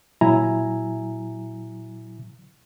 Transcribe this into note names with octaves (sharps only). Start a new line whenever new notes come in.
A#2 F#3 E4 E5 G#5 A#5